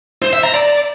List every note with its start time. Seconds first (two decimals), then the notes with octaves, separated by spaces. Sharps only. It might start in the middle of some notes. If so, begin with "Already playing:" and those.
0.22 C5
0.33 E5
0.43 A#5
0.54 D5